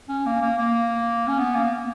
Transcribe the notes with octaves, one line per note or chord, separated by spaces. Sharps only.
C#4
A#3
A#3
A#3
C#4
B3
A#3